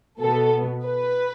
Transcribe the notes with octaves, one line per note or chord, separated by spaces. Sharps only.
B2 B3 A4
B4